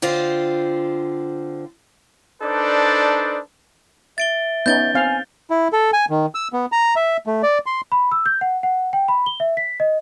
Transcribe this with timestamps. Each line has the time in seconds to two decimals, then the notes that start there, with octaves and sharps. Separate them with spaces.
0.02 D3 C4 F4 C5
2.42 D4 D#4 A4 B4 C5 D5
4.18 E5 A6 D7 G7
4.66 B3 C#4 D#4 G6 A6 G7
4.94 C4 F5 G#5
5.50 E4
5.73 A4
5.93 G#5
6.10 D#3
6.35 E6
6.53 B3
6.72 A#5
6.96 E5
7.27 A3
7.43 D5
7.66 C6
7.92 B5
8.12 E6
8.26 G6
8.41 F#5
8.63 F#5
8.93 G5
9.08 B5
9.26 G7
9.40 E5
9.57 B6
9.80 D#5